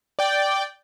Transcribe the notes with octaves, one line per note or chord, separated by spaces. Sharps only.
D5 G5